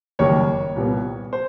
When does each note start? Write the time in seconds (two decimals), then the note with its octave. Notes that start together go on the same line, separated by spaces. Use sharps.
0.19 F#1 F#2 D#3 G3 A#3 C#5
0.76 C2 A#2 G3 B3
1.33 C5